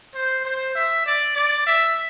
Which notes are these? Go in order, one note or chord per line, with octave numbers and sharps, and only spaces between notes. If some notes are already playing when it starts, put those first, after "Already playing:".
C5
C5
E5
D5
D5
E5